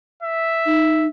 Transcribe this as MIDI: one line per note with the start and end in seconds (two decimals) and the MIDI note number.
0.23 1.09 76
0.66 1.07 63